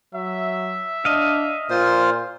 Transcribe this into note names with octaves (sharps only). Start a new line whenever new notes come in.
F#3 E5
D4 D#5 F5
A#2 F4 C5